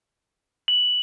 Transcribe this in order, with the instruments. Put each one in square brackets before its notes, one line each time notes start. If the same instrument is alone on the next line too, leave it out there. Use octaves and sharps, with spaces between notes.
[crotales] F#7